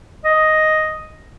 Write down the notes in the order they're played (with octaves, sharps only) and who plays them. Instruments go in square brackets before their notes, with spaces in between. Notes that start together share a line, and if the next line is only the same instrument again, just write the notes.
[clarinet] D#5